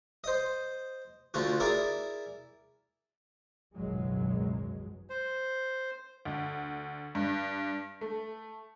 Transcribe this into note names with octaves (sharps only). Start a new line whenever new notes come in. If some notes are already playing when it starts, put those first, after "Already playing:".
C5 D#5
D2 D3 F4 F#4
E4 G#4 A#4 D5
G#1 C#2 F#2 B2 F#3 G#3
C5
D2
G2
A3